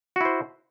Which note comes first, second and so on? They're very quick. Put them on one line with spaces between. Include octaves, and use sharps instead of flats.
F#4 E4 C5